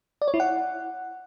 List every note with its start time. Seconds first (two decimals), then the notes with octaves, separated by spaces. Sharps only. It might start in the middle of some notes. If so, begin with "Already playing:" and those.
0.22 D5
0.28 C#5
0.34 E4
0.40 F#5